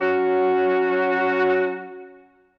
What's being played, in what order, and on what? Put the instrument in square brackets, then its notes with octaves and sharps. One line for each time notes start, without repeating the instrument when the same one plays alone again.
[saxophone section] F#3 C#4 F#4